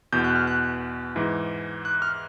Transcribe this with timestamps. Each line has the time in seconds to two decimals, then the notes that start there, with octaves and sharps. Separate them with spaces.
0.12 E2 B2 G6
0.24 F#6
0.36 F6
0.47 F#6
1.16 G#2 E3
1.85 F#6
2.02 F6